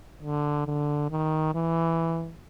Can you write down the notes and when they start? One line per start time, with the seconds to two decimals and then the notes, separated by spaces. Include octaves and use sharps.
0.22 D3
0.67 D3
1.11 D#3
1.55 E3